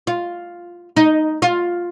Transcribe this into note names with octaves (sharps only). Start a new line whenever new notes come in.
F4
D#4
F4